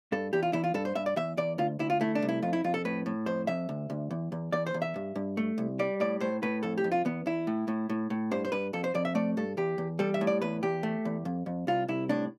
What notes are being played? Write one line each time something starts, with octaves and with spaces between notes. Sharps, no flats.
G2 A4
E2 G4
F4
E2 E4
F4
G2 A4
C5
G2 E5
D5
E2 E5
E2 D5
D2 F4
D2 E4
F4
A3 E4
D4
C2
E4
F2 F4
E4
F2 F4
A4
A2 B4
A2
F2 C5
F2 E5
D2
D2
E2
E2
E2 D5
C5
E2
E5
G2
G2
A3
C2
G3 D5
A2 D5
A2 C5
A2 B4
F2 A4
G4
F2
F4
E2 B3
E2 E4
A2
A2
A2
A2
G2 C5
C5
G2 B4
F2 A4
C5
F2 D5
E5
A3 D5
G2 A4
E2 G4
E2
G3 A4
E5
A2
D5
E2 B4
E2 G4
A3
E2
F2
F2
C2 F4
C2 E4
A2 D4